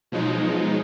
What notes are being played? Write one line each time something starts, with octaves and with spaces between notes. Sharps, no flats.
B2 F3 F#3 G#3 D#4